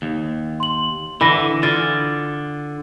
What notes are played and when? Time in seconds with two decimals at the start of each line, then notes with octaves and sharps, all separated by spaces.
0.02 D#2
0.60 C6 F#7
1.21 D3 E3 B5 A#6
1.63 D3 F4 A6